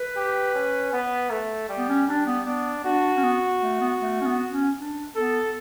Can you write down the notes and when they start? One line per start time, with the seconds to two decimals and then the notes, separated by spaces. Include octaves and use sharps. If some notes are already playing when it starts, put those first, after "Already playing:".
Already playing: B4
0.16 G4
0.55 C#4
0.93 B3
1.30 A3
1.69 G3
1.78 B3
1.89 C#4
2.07 G3 D4
2.26 B3
2.46 B3 D4
2.85 D4 F#4
3.17 C#4
3.23 B3
3.62 A3
3.80 B3
3.99 A3
4.21 C#4
4.25 B3
4.51 C#4
4.77 D4
5.16 B3 A4